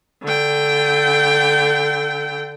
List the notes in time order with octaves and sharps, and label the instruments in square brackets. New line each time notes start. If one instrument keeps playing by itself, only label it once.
[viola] D3 G5